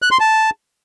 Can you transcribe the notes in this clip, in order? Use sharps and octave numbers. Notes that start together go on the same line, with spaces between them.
F#6
C6
A5